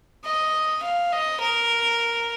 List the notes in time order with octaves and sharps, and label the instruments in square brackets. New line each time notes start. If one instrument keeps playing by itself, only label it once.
[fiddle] D#5
F5
D#5
A#4